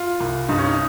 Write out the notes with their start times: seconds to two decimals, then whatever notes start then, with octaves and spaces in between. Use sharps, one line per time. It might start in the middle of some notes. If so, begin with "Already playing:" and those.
Already playing: F4
0.20 C2
0.49 G2 D#4
0.58 C#4
0.67 D#4